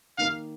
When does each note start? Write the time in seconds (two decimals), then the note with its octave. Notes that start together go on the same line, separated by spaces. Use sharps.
0.18 D#3 A#3 D#4 F5